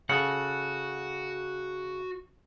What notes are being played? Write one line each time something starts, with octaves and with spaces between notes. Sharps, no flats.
C#3 F#4 A4 F#5